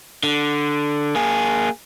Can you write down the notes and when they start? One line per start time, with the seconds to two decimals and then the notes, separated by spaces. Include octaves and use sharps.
0.23 D3
1.15 A#3 G#4